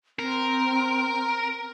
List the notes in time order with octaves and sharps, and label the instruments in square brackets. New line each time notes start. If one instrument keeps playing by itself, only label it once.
[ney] C4 [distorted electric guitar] A#4